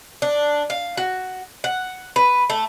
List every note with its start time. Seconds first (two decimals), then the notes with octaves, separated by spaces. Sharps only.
0.22 D4
0.70 F5
0.97 F#4
1.64 F#5
2.16 B4
2.50 A3